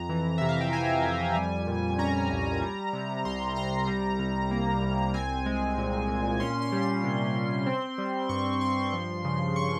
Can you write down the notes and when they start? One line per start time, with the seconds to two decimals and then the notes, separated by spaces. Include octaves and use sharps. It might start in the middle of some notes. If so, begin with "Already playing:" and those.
Already playing: F2 A#5
0.09 E3
0.38 C3 E5
0.49 F5
0.61 G5
0.73 F2 G#5
1.04 F2
1.35 G3
1.67 A#2
1.98 C#4 A#5
2.30 C2
2.62 G3
2.93 C3
3.25 C2 C6
3.56 C2 A#5
3.87 G3
4.19 C3
4.51 A#3
4.83 C2
5.14 C4 G#5
5.46 G#3
5.78 A#2
6.08 A#2
6.40 C#4 C6
6.62 C6
6.72 G3
6.82 C6
7.04 C3
7.35 C3
7.66 C4
7.98 G3
8.29 G2 C#6
8.61 G2 C6
8.93 F3
9.25 C#3
9.56 C#6